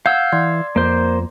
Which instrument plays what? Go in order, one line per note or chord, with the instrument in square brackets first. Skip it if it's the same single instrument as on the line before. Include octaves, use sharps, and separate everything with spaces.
[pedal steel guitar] F5 E6 [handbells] F#5 G6 G#6
[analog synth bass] E3 [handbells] D5 C6 G#6
[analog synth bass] F2 [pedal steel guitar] A#3 C5